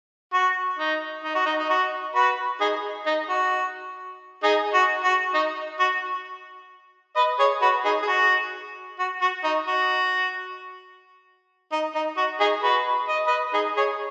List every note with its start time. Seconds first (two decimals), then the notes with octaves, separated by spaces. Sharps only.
0.33 F#4
0.79 D#4
1.24 D#4
1.35 F#4
1.46 D#4
1.59 D#4
1.70 F#4
2.15 F#4 B4
2.60 D#4 G#4
3.06 D#4
3.29 F#4
4.43 D#4 G#4
4.74 F#4
5.04 F#4
5.34 D#4
5.80 F#4
7.16 B4 D#5
7.39 G#4 C#5
7.62 F#4 B4
7.84 D#4 G#4
8.02 G#4
8.07 F#4
8.99 F#4
9.21 F#4
9.44 D#4
9.67 F#4
11.72 D#4
11.95 D#4
12.17 F#4
12.40 D#4 G#4
12.63 F#4 B4
13.08 D#5
13.27 B4 D#5
13.54 D#4 G#4
13.77 G#4 C#5